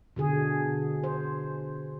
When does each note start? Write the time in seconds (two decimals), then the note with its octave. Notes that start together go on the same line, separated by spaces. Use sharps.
0.16 B2 D3 G#4
1.04 C5